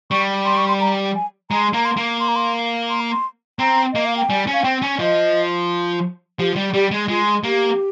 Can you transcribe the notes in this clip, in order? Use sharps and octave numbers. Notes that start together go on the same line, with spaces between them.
G3 C#6
C6
C#6
C6
A#5
G#5
G#3 A#5
A#3 A#5
C6
A#3
C6
A#5
C6
C6
A#5
C6
C4 A#5
A#3 D#5
F5
G5
G3 G#5
C#4
F5
C4 G5
C#4
F3 D#5
F3 G4
G3
G3 G4
G#3
G#3 F4
A#3 G4